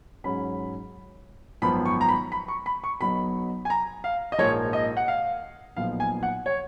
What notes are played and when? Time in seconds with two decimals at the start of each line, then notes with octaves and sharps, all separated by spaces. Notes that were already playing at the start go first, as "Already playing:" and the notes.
0.24 G#2 F#3 C#4 B5
1.62 G#1 F#2 F3 B3 B5
1.85 C#6
2.01 A#5
2.09 B5
2.32 B5
2.48 C#6
2.66 B5
2.84 C#6
3.01 B1 B2 F#3 B3 B5
3.65 G#5
3.70 A#5
4.04 F5
4.32 D#5
4.38 A#1 G#2 F3 A#3 C#5
4.73 D#5
4.97 F#5
5.08 F5
5.76 B1 A#2 F3 B3 F5
6.00 G#5
6.23 F#5
6.46 C#5